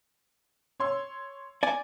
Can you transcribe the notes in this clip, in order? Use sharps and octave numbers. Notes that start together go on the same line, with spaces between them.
C#5 C6 E6
D5 G#5